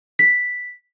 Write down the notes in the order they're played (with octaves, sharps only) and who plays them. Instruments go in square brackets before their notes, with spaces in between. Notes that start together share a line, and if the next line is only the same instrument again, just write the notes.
[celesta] B6